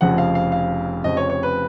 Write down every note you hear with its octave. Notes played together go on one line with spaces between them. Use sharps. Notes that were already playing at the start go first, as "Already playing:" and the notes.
F1 F2 C#3 F3 F#5
F5
F5
F5
F1 F2 C#3 F3 D#5
C#5
C#5
B4